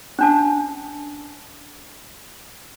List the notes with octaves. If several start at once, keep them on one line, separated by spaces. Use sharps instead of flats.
C#4 D4 A5